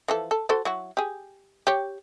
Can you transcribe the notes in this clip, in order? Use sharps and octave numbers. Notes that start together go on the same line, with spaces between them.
E3 F3 A4
A4
F#4 A4 C5
F#3 E4 F#4
G4 G#4
G4 C#5